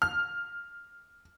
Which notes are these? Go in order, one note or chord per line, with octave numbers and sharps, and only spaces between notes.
F6